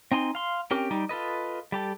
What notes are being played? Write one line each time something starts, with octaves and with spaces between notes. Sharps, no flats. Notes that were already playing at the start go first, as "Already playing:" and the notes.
C4 D#4 G#5 C6
F5 C6
C4 C#4 G4 A#4
G3 D#4 G4
F4 A4 B4 D#5
G3 G4 A4